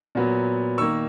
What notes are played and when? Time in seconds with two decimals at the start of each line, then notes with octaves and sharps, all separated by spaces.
0.15 A#2 F#3 B3
0.78 D#3 A#3 C#6 E6